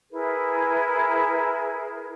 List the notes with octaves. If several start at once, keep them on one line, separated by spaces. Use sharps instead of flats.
E4 G#4 A#4 B4